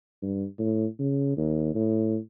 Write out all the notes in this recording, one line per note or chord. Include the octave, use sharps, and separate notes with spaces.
G2
A2
C#3
D#2
A2